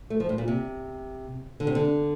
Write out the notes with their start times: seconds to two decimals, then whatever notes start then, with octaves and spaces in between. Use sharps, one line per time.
0.10 A3
0.20 F3
0.29 A2
0.38 A#2
0.48 C3
1.60 D3
1.67 C3
1.75 D3